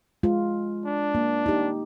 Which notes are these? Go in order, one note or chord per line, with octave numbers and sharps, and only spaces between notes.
G#3 F4
D4
A#3
D#4 G4